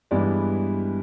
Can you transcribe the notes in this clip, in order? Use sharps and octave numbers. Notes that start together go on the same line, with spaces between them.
G2 E3 G#3 B3 D5